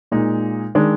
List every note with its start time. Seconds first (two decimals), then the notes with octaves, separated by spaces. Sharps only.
0.12 A#2 G#3 D#4
0.75 D#3 G#3 D4